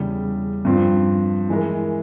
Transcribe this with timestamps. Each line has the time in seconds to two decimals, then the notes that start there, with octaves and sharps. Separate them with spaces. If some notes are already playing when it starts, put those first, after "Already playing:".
Already playing: E2 C#3 G3
0.65 G2 F3 C4
1.49 E3 G#3 E4 A#4